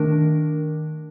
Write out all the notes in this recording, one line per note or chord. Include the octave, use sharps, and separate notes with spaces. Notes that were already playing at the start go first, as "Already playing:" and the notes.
Already playing: D#3 A3 D4 A#4